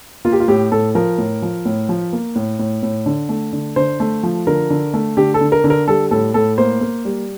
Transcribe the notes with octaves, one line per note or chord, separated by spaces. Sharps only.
A#3 F4
G4
F4
A2 G4
A2 A4
F3 A#4
A2
F3
A2
F3
A#3
A2
A2
A2
D3
A3
D3
D3 C5
A3
F3
D3 A#4
D3
A3
D3 G4
A4
D3
A#4
D3
A#4
G3 A4
A2 A4
A2 A4
A#3 C5
A#3
G3